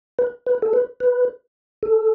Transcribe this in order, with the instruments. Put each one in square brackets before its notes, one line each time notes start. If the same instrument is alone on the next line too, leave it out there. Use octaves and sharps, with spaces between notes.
[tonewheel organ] B4
B4
A4
B4
B4
A4